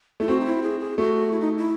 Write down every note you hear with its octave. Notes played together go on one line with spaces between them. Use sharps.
A3 E4
C4 F#4
D#4
E4
G#4
G#4
A3 F#4
E4
D#4
E4